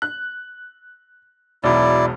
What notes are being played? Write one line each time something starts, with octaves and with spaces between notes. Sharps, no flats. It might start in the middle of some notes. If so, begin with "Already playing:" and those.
F#6
E1 B1 E4 D5